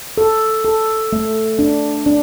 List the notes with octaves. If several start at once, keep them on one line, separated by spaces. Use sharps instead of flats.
A4
A4
A3
D4
D4